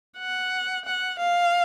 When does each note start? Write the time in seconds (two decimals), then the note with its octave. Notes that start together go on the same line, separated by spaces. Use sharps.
0.18 F#5
0.85 F#5
1.19 F5